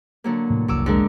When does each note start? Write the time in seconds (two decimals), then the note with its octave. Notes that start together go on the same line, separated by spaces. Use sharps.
0.24 D3 F#3 A#3
0.50 A2 C3 E3
0.68 F1 C2 E3 F#3 D6 E6
0.86 D3 G#3 A#4